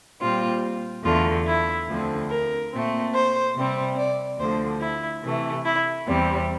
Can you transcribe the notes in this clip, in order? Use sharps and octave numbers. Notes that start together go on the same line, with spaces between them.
A#2 G3 C4 F4
E2 D3 A3 F4
E4
D2 D3 F3 C4
A#4
A#2 A3 C4
C5
C3 G3 C4
D5
D2 D3 F3 C5
E4
C3 E3 A3
E4
E2 C3 G3 C4